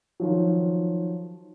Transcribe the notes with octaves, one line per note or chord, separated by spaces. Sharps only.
D#3 F3 F#3